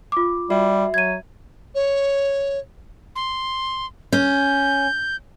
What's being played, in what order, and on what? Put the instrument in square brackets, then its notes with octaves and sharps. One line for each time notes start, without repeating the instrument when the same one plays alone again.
[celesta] F4 D6
[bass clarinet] G3 [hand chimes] F#4 E5
[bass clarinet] F#3 [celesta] G#6 D#7
[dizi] C#5
[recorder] C6
[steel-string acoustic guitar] C#4 [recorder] G6